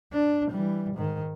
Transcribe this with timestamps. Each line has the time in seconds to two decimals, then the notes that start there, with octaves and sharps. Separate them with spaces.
0.13 D4
0.51 E3 G3
0.94 G#2 D#3